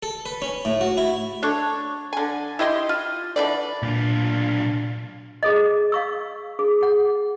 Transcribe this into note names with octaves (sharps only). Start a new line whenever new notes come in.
A4
B4
C#4
A2
F#4
E4
D4 A4 C#5
D3 G#5
E4 G4 D#5 C6
F4
D3 E3 D5
B1 A#2 D4 F4
G#4 A4 D#5
F5 C#6 E6
G#4
G#4 F#5